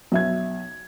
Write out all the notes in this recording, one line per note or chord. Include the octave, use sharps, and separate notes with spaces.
B1 E5 G#6